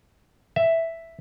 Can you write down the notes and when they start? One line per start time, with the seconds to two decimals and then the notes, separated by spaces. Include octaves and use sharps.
0.56 E5